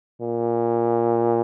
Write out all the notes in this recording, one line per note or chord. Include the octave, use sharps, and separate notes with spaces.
A#2